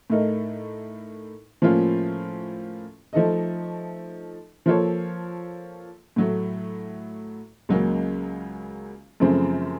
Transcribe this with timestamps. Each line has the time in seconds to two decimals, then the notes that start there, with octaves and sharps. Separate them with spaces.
0.10 A2 A3 D#4 A#4
1.62 A2 F3 A#3 C#4 F4
3.13 F3 A3 D#4 A4 D#5
4.66 F3 A#3 F4 A4 C#5
6.16 A2 F#3 A3
7.69 C#2 C#3 F#3 A#3
9.20 F#2 C#3 F3 A3 C4